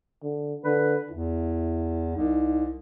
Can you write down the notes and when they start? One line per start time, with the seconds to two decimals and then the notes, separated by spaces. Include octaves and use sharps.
0.23 D3
0.64 D3 B4
1.10 E2 E4
2.16 C2 D#4